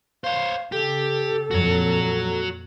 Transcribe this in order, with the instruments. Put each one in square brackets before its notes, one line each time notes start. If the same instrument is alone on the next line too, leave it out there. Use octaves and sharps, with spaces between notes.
[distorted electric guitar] C5 C#5 [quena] F5
[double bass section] C#3 [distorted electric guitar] G4 [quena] A4
[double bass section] F2 A#2 [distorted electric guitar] F#4 C#5